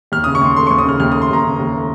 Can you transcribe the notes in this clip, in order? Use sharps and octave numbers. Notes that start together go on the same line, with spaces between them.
D#2 F6
C#3 D#6
C#6
D#2 C6
A3 C6
C#6
D#2
D#6
C#3 F6
D#2 F6
D#6
A3
C6
D#2 A#5
C#3
D#2
A3